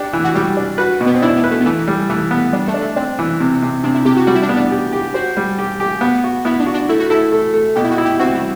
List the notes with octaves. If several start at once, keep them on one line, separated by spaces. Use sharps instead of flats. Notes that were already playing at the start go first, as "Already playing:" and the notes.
Already playing: D4 G4
E3
F#4
G3 G4
D4
F#4 B4
B2
B3
C4
D4 E4
B3
B4
A3
B3
E3 A3
G3
E3 A3
B3
G3 D4
A3
D4
A3
C4 D4
E3
C3
C3
C3 D4
E4
C3 G4
F#4
G3 F#4
E4
D4
B3
D4
G4
G4
F#4 C5
G3
G4
G4
B3
F#4
B3 E4
D4
F#4
D4
A3 E4
F#4
E4 A4
A3
A3
B2 G4
E4
F#4
E4
G4
C4 F#4
G3